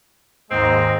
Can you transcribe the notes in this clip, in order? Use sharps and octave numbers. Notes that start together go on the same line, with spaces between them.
D#2 G#2 G#3 C4 D#5 A#5